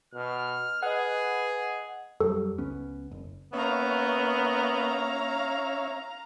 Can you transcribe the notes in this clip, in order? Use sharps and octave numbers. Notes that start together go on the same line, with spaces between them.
B2 F6
G#4 B4 D#5 F#5
F#2 F#3 G3 A4
C#2 B3 C#4
F#1
A#3 B3 C#4 C#5 E5 F5 A#5